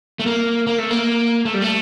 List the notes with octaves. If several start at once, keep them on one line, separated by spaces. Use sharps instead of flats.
A3
A#3
A#3
A3
A#3
A3
G3
A3